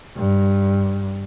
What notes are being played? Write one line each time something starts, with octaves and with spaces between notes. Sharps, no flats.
G2